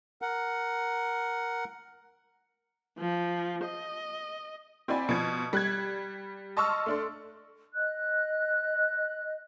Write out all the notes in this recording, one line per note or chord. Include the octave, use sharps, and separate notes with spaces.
A#4 F#5
F3
D#5
C4 E4 F#4 D5 G#5 B5
B2 F3 G#6
G3 F#6 G#6
D#5 A5 C6 C#6 E6 F6
A3 D4 C6
D#5 F#6